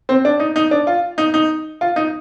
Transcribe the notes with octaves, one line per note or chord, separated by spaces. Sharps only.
C4
D4
D#4
D#4
D4
F4
D#4
D#4
F4
D#4